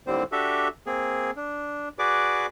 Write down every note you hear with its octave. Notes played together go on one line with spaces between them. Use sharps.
D#2 A2 D3 G3 C4 C5
D4 F#4 G4 A4 E5
A#3 C4 G#4
D4
F#4 G#4 B4 D5 D6